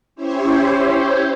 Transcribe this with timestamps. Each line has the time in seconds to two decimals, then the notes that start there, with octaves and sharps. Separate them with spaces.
0.16 C#4 E4 G4 C5 C#5